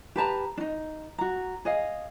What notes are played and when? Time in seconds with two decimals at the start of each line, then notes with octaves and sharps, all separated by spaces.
0.16 G4 B4 A5 A#5
0.57 D4 D#4
1.18 F#4 A#5
1.65 G#4 D#5 F5